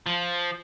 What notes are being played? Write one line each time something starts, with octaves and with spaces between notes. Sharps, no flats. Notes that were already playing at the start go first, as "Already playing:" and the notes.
F3